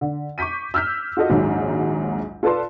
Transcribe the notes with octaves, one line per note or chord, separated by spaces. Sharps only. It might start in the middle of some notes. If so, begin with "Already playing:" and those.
D3
C#6 D6 G6 B6 D#7
E6 F6 G6 B6
F4 F#4 A4 D#5
A#1 D#2 G#2 F#3
F4 A4 B4 D5 A5 C6